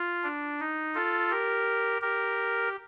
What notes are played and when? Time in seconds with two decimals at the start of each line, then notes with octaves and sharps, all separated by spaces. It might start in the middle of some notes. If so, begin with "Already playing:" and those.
Already playing: F4
0.24 D4
0.60 D#4
0.95 F4 A4
1.30 G4 A#4
2.02 G4 A#4